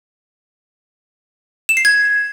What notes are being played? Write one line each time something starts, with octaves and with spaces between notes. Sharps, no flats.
E7
C7
G#6